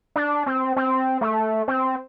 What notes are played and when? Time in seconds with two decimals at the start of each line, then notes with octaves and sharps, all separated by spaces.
0.16 D4
0.46 C4
0.76 C4
1.21 A3
1.68 C4